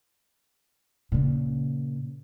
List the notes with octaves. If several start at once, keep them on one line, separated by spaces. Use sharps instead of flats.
A#2 C#3